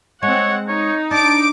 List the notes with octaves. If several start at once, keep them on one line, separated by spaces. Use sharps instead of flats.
G#3 C4 C#5 F#5
D#4 C#5
D4 A5 D6 D7